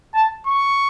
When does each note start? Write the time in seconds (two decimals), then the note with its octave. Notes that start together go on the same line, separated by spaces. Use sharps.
0.14 A5
0.47 C#6